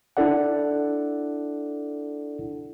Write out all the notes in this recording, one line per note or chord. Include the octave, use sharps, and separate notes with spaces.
D4 E4 A4 D5 F#5